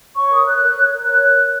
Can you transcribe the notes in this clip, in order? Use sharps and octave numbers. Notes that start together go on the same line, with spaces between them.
C#5 C#6
A#4 D#6
C#5 F#6
A#4
C#5
A#4
C#5 F#6